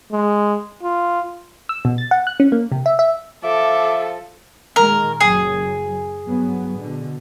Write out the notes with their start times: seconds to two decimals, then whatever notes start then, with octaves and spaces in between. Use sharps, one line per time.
0.12 G#3
0.83 F4
1.69 E6
1.85 B2
1.98 A6
2.11 F#5
2.27 F#6
2.40 C#4
2.52 A#3
2.72 C3
2.86 E5
2.99 E5
3.44 F3 A4 E5 D6
4.76 A#2 D#3 G#3 A#4
5.20 F#1 F#3 G#4
6.24 G2 F#3 B3
6.77 B2 D3